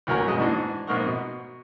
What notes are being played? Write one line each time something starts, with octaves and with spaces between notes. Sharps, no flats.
A1 D2 F#3 A#4 G#5 A#5
F#2 B2 G#3 D#5
G#2 E3 D4 F#4
A#1 G#2 C4 A#4 F#5 C#6
B2